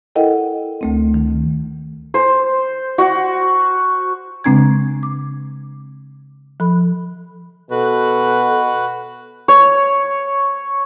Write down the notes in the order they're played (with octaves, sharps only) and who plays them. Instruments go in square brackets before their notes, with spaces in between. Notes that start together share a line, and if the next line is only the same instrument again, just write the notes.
[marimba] E4 A4 A#4 D#5 F#5 G5
D2 A3 C4
D#3
[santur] C5
F#4
[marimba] C#3 G#3 C4 D4 G#5 G#6
D6
F3 A4 B5
[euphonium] B2 [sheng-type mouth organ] F#4 B4 [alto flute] A4
[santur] C#5